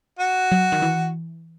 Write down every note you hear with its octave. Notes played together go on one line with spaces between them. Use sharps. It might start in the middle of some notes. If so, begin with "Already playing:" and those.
F#4
F#3
D#3
E3